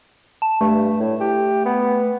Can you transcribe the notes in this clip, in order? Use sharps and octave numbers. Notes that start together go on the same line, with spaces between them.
A5
G2 A3
A2
G4
B3